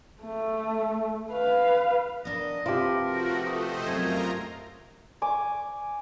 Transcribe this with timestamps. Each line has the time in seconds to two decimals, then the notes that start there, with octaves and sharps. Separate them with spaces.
0.23 A3
1.32 B4 F5
2.25 B3 D4 A#4 D#5
2.66 C3 F4 G4 A#4 B4 A5
3.00 F3 A3 F#4
3.47 A3 C5 D#5 D#6
3.86 F#2 C3 F4 A#4 G#5 A#5
5.22 G#5 D6